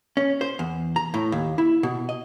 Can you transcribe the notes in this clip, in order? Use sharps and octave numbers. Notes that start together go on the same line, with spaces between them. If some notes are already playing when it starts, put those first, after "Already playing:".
C#4
C5
E2
A#5
A2
D#2
E4
B2
D#5